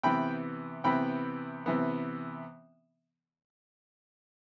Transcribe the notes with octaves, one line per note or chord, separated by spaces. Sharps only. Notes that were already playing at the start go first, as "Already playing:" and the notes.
C3 E3 B3 G5 B5
C3 E3 B3 G5 B5
C3 E3 B3